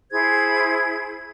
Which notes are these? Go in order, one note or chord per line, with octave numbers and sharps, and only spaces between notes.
E4 G#4 C5 G#6